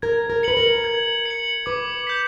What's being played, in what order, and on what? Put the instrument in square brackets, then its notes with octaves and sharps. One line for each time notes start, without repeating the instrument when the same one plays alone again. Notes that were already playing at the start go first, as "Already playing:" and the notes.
[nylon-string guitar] A#4 [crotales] G#6
[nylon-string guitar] A#4
[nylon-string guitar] B4 [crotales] C#7 F#7
[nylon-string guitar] A#4
[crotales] G#6
C#7 F#7
[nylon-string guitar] B4 [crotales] D6
[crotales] G6 B6